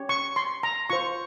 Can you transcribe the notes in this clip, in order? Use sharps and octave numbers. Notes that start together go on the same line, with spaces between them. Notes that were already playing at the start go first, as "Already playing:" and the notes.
Already playing: C#4 G4 C#5
C#6
C6
A#5
F4 C5 C#6